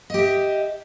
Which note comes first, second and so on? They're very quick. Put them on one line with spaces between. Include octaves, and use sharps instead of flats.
D#5 G4 E5